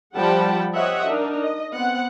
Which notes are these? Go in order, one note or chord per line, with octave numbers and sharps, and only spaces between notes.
F3 G3 F#5 G5 A5 B5
G4 C5 C#5 D#5 E5 F#5
D4 D#4 A#4
D#5
B3 C4 F#5